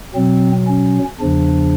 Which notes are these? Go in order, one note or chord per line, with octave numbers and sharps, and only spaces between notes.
B2 F#3 C4
C#4
E2 C#3 F3 D4